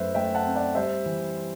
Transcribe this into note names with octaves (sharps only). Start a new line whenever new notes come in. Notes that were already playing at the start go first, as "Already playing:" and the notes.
Already playing: F#2 A3 B4 C5 E5
A3 E5 G5
F#5 A5
C4
D5 F#5
G3 C5 E5
E3